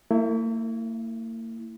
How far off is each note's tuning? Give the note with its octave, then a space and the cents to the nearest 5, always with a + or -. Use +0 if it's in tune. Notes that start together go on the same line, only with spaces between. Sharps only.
A#3 -45 E4 +0